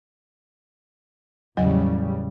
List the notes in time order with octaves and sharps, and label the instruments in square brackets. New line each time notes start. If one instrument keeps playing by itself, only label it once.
[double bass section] A1 C#3 G3 [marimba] E2 F#3 D#5